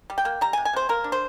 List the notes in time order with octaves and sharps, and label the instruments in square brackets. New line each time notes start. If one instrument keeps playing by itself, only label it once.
[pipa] G3
G5
A#3
G3 A#5
G#5
C3
G#5
C3 C5
A#3 A#4
D4
C5